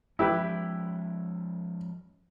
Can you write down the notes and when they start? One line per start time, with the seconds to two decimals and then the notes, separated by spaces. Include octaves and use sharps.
0.19 F3 G#3 C#4 E4 G4 B4